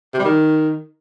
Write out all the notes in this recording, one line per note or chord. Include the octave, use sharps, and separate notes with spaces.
C3
G3
D#3